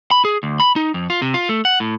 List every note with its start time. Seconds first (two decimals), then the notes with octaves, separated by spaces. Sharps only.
0.11 B5
0.25 G#4
0.43 D2
0.60 B5
0.76 D#4
0.94 F2
1.10 F4
1.22 C3
1.34 F4
1.49 A3
1.65 F#5
1.80 A2